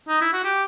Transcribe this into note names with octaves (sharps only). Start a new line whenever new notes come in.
D#4
E4
F#4
G4